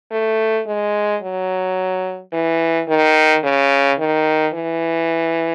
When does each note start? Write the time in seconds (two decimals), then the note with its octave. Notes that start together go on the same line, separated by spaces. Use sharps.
0.11 A3
0.67 G#3
1.22 F#3
2.33 E3
2.88 D#3
3.43 C#3
3.99 D#3
4.54 E3